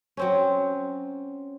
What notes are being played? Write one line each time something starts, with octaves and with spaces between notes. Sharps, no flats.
F#3 C4 C#4